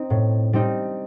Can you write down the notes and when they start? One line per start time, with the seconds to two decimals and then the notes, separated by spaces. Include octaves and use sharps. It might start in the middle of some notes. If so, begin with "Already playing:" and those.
Already playing: C4 D#4
0.10 A2
0.53 G3 C4 D#4